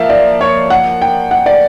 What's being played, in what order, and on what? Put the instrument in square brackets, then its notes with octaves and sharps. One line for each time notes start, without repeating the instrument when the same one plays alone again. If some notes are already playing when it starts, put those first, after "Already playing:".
Already playing: [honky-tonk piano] F3 A#3 [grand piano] E5 F5
[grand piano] D5
C#5
F#5
G5
F#5
D5